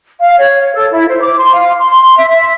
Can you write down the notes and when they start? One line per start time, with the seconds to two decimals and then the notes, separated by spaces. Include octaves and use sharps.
0.21 F5
0.39 C#5
0.75 A4
0.91 E4
1.08 C5
1.22 D6
1.39 C6
1.53 F5
1.80 C6
2.16 E5
2.29 E5